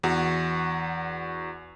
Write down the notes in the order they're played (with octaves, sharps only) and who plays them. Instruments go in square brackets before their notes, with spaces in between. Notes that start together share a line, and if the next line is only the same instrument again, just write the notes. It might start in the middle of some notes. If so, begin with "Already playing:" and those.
[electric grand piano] E2 F#4